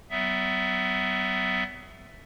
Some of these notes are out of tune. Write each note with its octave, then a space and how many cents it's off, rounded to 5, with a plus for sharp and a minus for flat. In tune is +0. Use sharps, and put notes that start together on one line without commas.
F#3 +45 B3 +30 E5 +0